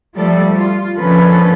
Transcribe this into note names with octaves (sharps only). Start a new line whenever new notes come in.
F3 G3 A3 A4 D5
F4
D3 F3 A#3 C#4 A4 B4